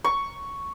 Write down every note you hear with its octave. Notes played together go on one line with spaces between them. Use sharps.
C#6